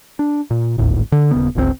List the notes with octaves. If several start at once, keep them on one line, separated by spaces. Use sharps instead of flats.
D4
A#2
D#1 G#1 D2 A2
D3
D#1 C#3 B3
G1 C#2 C#3 C4